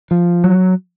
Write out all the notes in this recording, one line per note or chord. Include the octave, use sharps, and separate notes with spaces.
F3
F#3